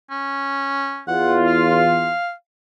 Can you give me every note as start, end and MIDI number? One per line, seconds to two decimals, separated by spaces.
0.11 1.02 61
1.08 2.10 40
1.08 2.10 65
1.08 1.37 78
1.47 2.32 77